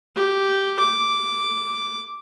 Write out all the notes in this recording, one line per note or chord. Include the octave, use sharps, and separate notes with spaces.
G4
D6